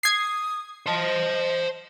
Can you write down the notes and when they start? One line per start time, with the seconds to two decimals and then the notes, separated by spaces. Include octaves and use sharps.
0.03 D#6 G#6 C7
0.86 C5 D#5 A5